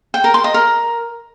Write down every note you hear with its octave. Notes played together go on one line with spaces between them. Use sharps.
G5
A#4
C6
D#5
A#4